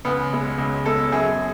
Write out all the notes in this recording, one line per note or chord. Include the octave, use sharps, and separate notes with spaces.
C#2 B3
B2 G#3
C#2
B2 G#3 A4
F#2 G#4